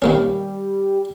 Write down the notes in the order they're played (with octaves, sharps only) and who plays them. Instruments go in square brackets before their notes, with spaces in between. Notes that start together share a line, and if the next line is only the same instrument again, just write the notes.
[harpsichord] D#3 A#3 C#4 [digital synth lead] G3